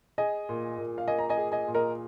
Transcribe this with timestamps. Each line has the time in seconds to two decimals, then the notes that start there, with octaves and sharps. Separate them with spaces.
0.18 G#4 D#5 G#5
0.49 A#2
0.78 A#2
0.98 F5
1.08 A#3 D#5 G#5
1.19 A#5
1.29 D#5 G#5
1.37 G#4
1.52 D#5 G#5
1.68 A#2
1.75 A#4 D#5